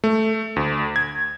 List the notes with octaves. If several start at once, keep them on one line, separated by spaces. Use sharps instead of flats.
A3
D2
G#6